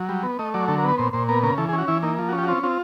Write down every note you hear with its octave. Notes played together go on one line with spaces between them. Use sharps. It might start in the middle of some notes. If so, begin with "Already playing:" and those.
Already playing: F#3
G3
B3
A3 D#5
F#3 D5
D3 A4
A#4
B3 B4
A#2 C5
A#2 C5
B3 A#4
C#3 A#4
E3 A4
G#4
C#4
F#4
E3 E4
A#3 D#4
F3
F#4
C#4
G4
F#4
C4 F4
C4 F4